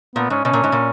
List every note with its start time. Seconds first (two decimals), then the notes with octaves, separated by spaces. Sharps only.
0.16 A#2 B3
0.30 G#2 C#4
0.44 B2 C#4
0.53 A#2
0.64 G#2
0.72 A#2